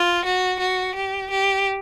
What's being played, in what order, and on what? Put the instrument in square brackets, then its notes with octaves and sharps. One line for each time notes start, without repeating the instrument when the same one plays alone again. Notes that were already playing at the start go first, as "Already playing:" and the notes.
Already playing: [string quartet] F4
F#4
F#4
G4
G4